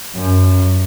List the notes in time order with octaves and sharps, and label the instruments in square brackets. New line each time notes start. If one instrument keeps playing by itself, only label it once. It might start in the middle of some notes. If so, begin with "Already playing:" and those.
[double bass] F#2